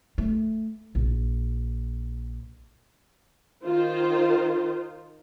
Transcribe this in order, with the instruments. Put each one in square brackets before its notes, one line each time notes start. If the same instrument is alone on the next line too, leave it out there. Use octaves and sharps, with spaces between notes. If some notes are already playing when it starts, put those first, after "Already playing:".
[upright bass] A3
A#1
[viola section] D#3 F4 C5